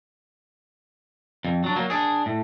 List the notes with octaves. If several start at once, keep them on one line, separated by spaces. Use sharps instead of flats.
F2
F#3 D4
F#3 A#3
D4 G#4
A2